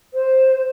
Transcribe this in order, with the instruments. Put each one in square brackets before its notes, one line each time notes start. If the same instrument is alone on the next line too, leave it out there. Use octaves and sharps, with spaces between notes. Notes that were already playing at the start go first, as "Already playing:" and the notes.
[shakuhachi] C5